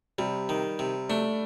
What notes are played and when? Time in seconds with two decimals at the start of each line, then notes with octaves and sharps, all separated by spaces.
0.18 C3 G3
0.49 D#3
0.79 C3
1.09 A3 D4